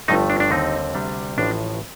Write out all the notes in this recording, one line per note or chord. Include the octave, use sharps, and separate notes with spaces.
G1 G2 F3 A3 D#4
D4
D4
D#2 D3 G3 C4 D#4
D2 C3 G3 D4
A1 A2 F3 D4